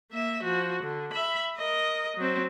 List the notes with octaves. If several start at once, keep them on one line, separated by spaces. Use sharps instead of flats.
A#3 E5
F3 F#4
D3
E5 B5
A#4 D#5
F#3 C4